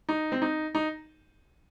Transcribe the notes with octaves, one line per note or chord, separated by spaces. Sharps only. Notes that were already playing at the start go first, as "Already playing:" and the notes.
D#4
C4
D#4
D#4